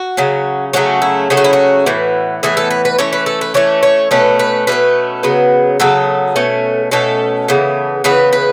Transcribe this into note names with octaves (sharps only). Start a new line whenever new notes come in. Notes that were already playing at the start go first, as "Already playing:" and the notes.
Already playing: F#4
C#3 F#3 C#4
C#3 F#3 A3 C#4 F#4
E4
C#3 F#3 A3 C#4 G#4
F#4
E4
F#4
A2 E3 B3
A2 E3 B3 G#4
A4
B4
B4
E3 A3 C#4 C#5
B4
A4
B4
E3 A3 C#4 C#5
C#5
B2 A3 C#4 B4
B4
B2 A3 C#4 B4
C#3 F#3 B3
C#3 F#3 B3 A4
B2 A3 C#4
B2 A3 C#4 A4
C#3 E3 B3
C#3 E3 B3 B4
B4